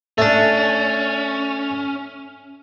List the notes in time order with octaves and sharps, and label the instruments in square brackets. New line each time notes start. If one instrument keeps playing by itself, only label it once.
[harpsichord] A3 D4 [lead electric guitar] C#4